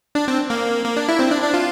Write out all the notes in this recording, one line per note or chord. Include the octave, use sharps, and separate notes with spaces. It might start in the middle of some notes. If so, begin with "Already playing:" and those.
D4
C4
A#3
A#3
D4
E4
C4
D4
D4
F4